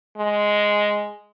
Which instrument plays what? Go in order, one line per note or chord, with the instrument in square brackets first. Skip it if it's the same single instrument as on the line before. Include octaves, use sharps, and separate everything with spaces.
[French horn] G#3